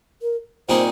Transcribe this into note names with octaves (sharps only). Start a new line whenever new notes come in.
A#4
A#2 G3 C4 D#4 G#4 C5